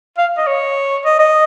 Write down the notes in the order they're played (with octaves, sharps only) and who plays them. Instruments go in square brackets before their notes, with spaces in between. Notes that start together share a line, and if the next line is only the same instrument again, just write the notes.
[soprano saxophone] F5
D#5
C#5
D#5
D#5